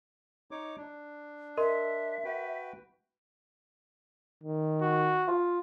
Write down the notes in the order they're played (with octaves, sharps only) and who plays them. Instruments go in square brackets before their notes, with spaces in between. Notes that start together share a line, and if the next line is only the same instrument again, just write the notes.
[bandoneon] D#4 C#5 D6
D4
[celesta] A#4 D#5 C6 [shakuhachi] E5
[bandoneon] F#4 B4 G5
[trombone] D#3
[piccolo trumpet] F#4
[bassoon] F4